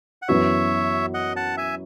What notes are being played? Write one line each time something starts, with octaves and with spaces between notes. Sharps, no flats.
F#5
F#2 E3 B3 F#4 C#5 E5
D#5 F#5
F#5 A5
E5 G#5